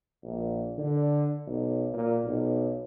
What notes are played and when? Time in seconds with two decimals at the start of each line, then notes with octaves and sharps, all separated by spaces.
0.24 A#1
0.78 D3
1.47 B1
1.93 A#2
2.25 B1